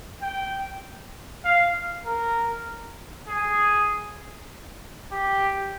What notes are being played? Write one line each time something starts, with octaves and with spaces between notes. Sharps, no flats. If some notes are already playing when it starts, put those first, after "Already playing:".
G5
F5
A#4
G#4
G4